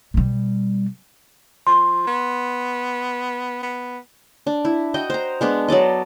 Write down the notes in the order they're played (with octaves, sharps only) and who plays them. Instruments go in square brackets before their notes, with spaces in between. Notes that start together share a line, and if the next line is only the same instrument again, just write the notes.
[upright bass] B2 G3
[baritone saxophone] F3 [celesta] C6
[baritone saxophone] B3
B3
[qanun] D4
E4
F#4 D#5 G5
C5 A#5
G#3 B3 D4
F#3 A4 D5 D#5